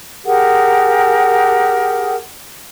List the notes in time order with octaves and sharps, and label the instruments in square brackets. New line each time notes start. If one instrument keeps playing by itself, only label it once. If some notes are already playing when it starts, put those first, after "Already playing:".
[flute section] G4 G#4 A#4 F#5